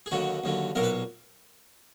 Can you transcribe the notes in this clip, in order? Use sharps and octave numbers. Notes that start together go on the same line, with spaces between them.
G#4
D#2 D3 F#3 F#4
D#2 D3 F#3
B1 A#2 F#3 A#4
B4